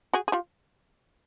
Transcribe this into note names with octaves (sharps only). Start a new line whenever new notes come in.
F#4 G#4
G#4
F4 G4